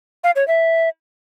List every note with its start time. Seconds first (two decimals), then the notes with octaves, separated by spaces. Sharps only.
0.24 F5
0.36 C#5
0.48 E5